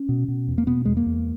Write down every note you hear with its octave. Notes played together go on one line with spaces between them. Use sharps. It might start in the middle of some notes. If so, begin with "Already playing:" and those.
Already playing: C#4
B2
B2
E2
A#3
B2 B3
E2 G#3
A#3
E2